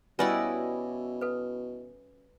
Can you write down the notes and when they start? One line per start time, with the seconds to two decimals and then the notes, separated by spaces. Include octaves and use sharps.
0.19 B2 G3 C#4 E4 F#4 B4 D5 D#5
1.21 A4 B4